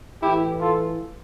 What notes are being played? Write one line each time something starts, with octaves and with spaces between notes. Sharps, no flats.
A2 E3 E4 G4
F4 A4